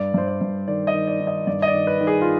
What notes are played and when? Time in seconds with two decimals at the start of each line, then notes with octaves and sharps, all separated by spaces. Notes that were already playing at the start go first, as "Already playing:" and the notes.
Already playing: G2 D5
0.14 G2 C5
0.28 D5
0.41 G2
0.68 D#3 D5
0.87 D#5
0.94 D#3
1.07 D5
1.21 D#3
1.27 D#5
1.47 G2 D5
1.62 D#5
1.68 D5
1.74 D#3
1.87 B4
2.01 D#3
2.07 G#4
2.21 F4